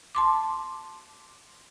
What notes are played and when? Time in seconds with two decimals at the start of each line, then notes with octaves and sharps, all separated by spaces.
0.15 A5 C6 D6